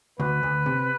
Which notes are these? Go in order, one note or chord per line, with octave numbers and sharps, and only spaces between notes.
D2 B4
D2
C3